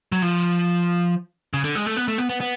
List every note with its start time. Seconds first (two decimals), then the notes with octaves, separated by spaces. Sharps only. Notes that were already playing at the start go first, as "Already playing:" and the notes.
0.12 F#3
0.22 F3
1.54 C#3
1.64 D3
1.75 G#3
1.86 A3
1.97 B3
2.08 A3
2.18 B3
2.29 B3
2.41 B3